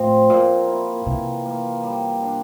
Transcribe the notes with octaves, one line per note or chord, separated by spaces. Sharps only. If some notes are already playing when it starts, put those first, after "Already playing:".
Already playing: A2 F3 C4
A#2 A#3
E4
C3 E3
A#3
G3
D4